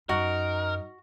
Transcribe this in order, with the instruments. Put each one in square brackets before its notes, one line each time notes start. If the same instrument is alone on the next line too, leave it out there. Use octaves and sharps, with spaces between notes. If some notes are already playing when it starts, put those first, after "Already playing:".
[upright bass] F#2 [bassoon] D#4 [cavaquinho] F#4 [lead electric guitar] A#4